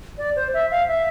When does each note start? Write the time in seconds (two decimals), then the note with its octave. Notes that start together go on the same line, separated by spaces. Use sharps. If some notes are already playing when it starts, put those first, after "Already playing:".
0.18 D5
0.36 C5
0.54 E5
0.71 F5
0.88 E5